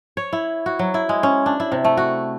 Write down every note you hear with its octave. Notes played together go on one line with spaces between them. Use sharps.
C#5
E4
F#4
F#3
E4
G#3
C#4
D4
E4
C3
A3
F#4